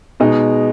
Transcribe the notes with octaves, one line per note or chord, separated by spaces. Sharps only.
B2 G#3 D#4